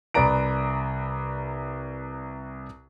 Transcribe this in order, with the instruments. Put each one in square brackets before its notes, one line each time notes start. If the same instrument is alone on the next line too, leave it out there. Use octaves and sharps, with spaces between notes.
[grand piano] C2 B4 D5 A#5 D7